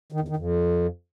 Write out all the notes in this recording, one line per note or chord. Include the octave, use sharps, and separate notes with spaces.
D#3
E2
D#3
F2